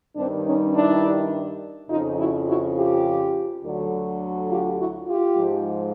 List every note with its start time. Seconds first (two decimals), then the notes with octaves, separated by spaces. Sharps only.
0.16 G2 D#3 G3 C4 D4
0.46 C#4 D#4
0.74 D4 E4
1.89 F2 C#3 F3 D#4 F4
2.19 E4 F#4
2.48 E4 F#4
2.77 F4 G4
3.63 D2 D3 F#3
4.50 F4 G4
4.78 E4 F#4
5.07 F4 G4
5.35 G#2 F3 G#3